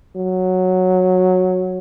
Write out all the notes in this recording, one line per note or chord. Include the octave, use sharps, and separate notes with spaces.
F#3